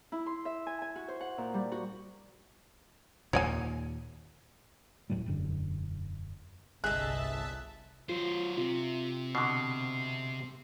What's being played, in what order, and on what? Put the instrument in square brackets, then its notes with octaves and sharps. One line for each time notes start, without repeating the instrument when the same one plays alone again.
[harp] E4
C6
E5
G#5
G#5
F#4
C5
F#5
A#2
G3
F#4
[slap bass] D#2 A#2 [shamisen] C#5 D5 G#5
[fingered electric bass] D#1 A2 F#3 G3
E1 F#2 D3
[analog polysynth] G1 E5 A5 [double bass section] C2 [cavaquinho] G#4 D#5 [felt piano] F#6
[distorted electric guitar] F#3 C5 [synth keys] F4
[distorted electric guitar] C3 [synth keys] F4
[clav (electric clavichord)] B2 D3 [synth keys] C7